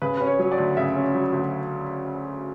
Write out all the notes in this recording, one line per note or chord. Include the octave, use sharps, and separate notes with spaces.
C#3 B4
C#4 B4
C#5
F#3 C#5
D5
D2
C#3 E5
C#4
F#3
D2